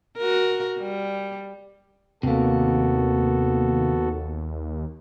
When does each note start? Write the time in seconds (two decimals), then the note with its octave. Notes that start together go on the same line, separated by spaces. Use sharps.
0.17 F#4 A#4
0.79 G3
2.23 D#2 C3 A#3 B3 F#4 A4